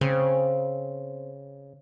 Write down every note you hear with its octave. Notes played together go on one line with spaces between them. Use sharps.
C#3 C4